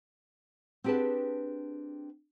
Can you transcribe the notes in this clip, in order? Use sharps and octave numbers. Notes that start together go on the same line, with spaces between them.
C4 D4 G4 G#4 B4 A5